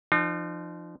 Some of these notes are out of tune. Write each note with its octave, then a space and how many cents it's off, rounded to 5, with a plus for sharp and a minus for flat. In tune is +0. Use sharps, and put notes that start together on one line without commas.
F3 -20 D#4 -45